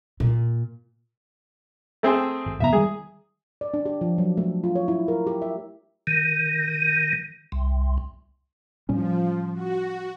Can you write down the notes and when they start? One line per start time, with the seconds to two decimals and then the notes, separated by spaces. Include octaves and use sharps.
0.20 A#2
2.03 A3 C4 G#4
2.46 G#1
2.60 F1 B3 E5 A#5
2.73 D#3 G3 G#3 G#4
3.61 D5
3.74 D4
3.86 G4
4.01 F3
4.18 F#3
4.37 A3
4.64 F4
4.75 C#5
4.88 E4
5.08 A#4
5.27 G4
5.42 E5
6.07 D#3
7.52 C2
8.89 A2 F3 G3 C#4
9.53 F#4